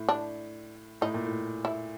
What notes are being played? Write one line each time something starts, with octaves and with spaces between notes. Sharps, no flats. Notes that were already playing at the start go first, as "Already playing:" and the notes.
Already playing: A2
D4
A2 D#4
A#2
A2
E4